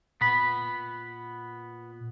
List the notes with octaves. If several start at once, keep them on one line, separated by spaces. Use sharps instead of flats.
A#2 B3 B5